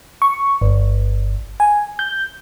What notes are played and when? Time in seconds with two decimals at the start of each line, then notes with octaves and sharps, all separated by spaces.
0.22 C#6
0.61 G1
1.60 G#5
1.99 G6